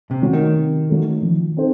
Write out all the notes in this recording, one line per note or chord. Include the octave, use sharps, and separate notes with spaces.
C3
C#3 F#3 A3
D#3
C3
F#3 A3
F3
C4 D#4 A4 C5